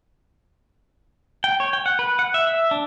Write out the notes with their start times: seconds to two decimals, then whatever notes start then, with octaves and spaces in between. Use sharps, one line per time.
1.44 G5
1.60 C#5
1.73 G5
1.86 F#5
1.99 B4
2.19 F#5
2.34 E5
2.47 E5
2.71 D4